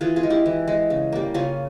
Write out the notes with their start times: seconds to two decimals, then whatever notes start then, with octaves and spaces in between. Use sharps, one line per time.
0.01 E3 F4 G#4
0.16 F4 G#4
0.23 G#3
0.30 E4 G4
0.46 E3
0.68 G#3
0.90 C#3
1.12 G3 A#3
1.34 C#3 C#4 F4